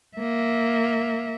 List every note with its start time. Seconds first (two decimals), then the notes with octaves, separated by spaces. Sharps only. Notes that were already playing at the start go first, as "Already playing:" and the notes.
0.17 A#3 E5